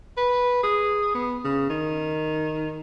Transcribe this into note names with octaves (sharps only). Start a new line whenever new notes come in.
B4
G#4
B3
C#3
D#3